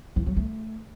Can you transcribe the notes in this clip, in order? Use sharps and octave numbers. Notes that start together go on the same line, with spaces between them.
E3
F#3
A3